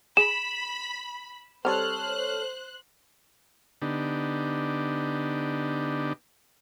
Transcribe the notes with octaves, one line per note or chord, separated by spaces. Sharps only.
G#4 B5 E7
G3 C4 A4 C5 C#5 F6 F#6
D3 B3 D4 D#4 G4